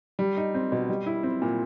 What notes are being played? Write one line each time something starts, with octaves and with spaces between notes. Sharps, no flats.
G3
D#4
C4
B2
G3
E4
C4
A#2